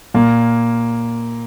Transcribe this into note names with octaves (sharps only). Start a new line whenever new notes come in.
A#2 A#3